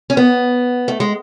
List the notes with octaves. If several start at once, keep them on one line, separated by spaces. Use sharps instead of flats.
C#4
B3
A3
G#3